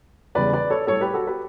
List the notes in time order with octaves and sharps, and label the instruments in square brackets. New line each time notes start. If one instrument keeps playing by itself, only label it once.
[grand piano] E2 C#3 G3 B4 D5
B4 D5
A4 C#5
A2 G3 A4 C#5
G4 B4
F#4 A4
G4 B4